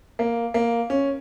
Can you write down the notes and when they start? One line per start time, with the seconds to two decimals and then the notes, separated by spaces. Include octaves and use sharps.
0.19 A#3
0.54 A#3
0.90 C#4